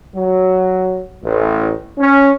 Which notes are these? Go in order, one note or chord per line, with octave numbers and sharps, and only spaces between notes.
F#3
A1
C#4